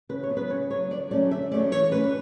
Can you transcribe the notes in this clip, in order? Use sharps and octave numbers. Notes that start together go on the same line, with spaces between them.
C#3 B4
C#5
F#3 B3
B4
C#3 C#5
F#3 B3 C#5
D3 D5
F#3 A3 C#4 D5
D3 E5
F#3 A3 C#4 D5
E3 C#5
A3 C#4 B4